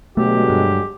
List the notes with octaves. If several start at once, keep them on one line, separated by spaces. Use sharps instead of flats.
B2 D3 F#3 G#3 A3 G4
G2